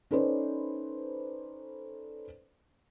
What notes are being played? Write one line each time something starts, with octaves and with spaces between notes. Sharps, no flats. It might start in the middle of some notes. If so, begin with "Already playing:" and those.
C#4 D#4 A4 B4 C5 D5